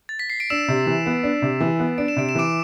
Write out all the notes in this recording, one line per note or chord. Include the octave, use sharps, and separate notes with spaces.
A6
B6
C7
D7
D4 E6 E7
C3
E3
B3
D4
C3
E3
B3
D4 D7
E7
C3 D7
E7
E3 D6 D7